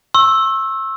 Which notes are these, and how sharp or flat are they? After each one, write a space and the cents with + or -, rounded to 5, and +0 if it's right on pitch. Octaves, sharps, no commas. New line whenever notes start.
C#6 -45 E6 +0